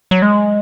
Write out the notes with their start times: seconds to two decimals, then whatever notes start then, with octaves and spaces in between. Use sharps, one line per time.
0.11 F#3
0.22 G#3